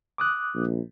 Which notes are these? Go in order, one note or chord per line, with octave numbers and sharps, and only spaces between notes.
D6 D#6 F#6
A#1